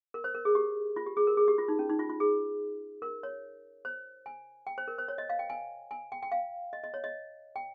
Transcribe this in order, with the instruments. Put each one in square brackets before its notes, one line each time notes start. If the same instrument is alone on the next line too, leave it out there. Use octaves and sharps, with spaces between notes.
[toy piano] A#4
C5
A#4
G#4
G4
F4
G4
G#4
A#4
G#4
G4
F4
D#4
C#4
D#4
F4
F4
G#4
A#4
C#5
C5
G#5
G5
C5
A#4
C5
C#5
D#5
F5
G5
G#5
G#5
G5
G5
F5
D#5
D#5
C#5
D#5
G5